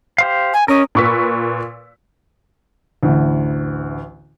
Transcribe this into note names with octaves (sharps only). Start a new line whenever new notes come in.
G4 C5 F5
G#5
C#4 A#4 D#5
A#2 B4 C#6 E6 B6
A1 D2